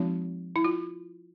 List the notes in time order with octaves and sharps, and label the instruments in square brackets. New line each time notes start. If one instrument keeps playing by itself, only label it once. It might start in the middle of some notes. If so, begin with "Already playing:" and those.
Already playing: [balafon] F3 G#3 C4 D#4 F#4
E4
F4